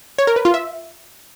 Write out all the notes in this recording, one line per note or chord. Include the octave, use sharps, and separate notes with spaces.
C#5
A#4
B4
F4
E5